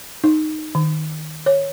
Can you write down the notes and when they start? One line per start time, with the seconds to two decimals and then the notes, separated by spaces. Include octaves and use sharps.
0.24 D#4
0.75 D#3
1.46 C#5